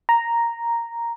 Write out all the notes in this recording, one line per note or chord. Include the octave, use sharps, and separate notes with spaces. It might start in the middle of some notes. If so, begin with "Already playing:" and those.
A#5